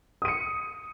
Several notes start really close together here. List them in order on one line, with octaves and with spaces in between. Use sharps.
D#6 D#7 C#7